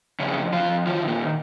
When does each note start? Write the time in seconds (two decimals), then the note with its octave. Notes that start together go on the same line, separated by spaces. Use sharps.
0.20 F2 C#3 C#4
0.37 F2
0.53 F2 F3 F4
0.69 F2
0.86 D#3 F3 F4
1.02 D#3
1.07 A#2 A#3
1.19 D#3